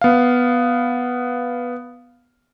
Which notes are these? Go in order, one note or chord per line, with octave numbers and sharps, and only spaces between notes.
B3 F5